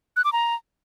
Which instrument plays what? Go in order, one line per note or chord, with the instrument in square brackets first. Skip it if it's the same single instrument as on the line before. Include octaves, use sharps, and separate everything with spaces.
[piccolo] F#6
D6
A#5